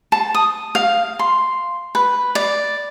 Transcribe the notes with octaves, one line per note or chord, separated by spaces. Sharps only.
A5
D#6
F5
C6
B4
D5